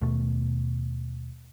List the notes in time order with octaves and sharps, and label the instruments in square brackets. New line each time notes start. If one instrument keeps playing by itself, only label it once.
[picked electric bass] D#2 B2 A3